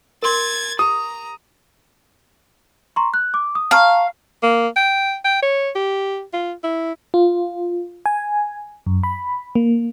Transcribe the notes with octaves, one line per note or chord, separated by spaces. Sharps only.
A#4 C6 G#6 A6
G4 A#5 D#6
A#5 C6 C#6
F#6
D6
D#6
F5 A5 A#5 C#6
A#3
G5
G5
C#5
G4
F4
E4
F4
G#5
F#2
B5
A#3